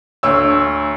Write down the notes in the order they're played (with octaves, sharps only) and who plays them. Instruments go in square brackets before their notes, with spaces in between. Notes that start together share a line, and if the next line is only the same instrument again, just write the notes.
[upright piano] D2 C#5 E6